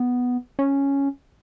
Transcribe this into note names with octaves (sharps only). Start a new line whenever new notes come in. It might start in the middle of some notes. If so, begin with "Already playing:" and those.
Already playing: B3
C#4